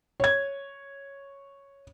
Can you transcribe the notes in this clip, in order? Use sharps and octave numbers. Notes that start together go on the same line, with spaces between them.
C#5 G#6